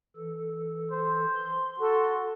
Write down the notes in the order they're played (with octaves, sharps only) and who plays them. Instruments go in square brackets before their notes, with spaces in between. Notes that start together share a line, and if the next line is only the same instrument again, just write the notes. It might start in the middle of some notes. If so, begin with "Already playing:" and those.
[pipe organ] E3 A4
[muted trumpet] C5
[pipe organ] C6
[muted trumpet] F#4 [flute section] A4